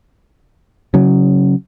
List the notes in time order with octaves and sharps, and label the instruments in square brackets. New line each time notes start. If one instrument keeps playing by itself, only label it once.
[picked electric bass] C#3 F#3